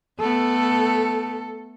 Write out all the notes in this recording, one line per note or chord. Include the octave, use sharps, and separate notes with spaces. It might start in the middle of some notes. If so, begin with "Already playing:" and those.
A3 B3 A4